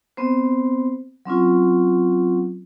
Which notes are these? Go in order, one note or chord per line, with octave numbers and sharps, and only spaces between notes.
B3 C4 C5
F#3 C4 C#4 F4